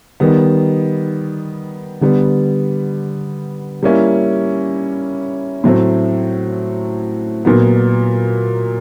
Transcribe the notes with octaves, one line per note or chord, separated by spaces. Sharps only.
D#3 G3 B3
D3 G3 B3
G3 A#3 C#4 E4
A2 F#3 A3 C4
A#2 F#3 B3